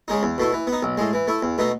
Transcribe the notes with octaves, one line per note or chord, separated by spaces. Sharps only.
C#3 G#3 D#4
E2
B2 A3 E4
E3
B3
D#4
B1
A2 G#3
E3
A3 E4
E2
B2 A3 D#4